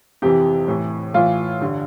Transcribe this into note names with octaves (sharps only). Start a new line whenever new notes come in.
F2 C3 E3 G4
A2 E3
A2 E3 F4
G2 D3